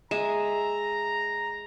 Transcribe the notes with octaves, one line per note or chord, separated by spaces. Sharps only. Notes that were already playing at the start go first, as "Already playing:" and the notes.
G#3 E5 A#5